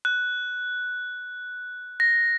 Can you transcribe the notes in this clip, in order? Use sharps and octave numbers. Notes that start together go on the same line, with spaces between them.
F#6
A#6